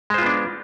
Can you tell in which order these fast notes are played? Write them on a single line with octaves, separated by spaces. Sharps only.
G#3 C5 F4 B3 D4